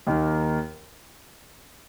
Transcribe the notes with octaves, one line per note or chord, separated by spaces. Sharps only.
D#2 D#3 A#3